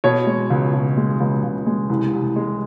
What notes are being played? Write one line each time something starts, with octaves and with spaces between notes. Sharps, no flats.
B2 C#5
G#3
C#2
B2
G#3
C#2
C#2
G#3
C2
C2
G#3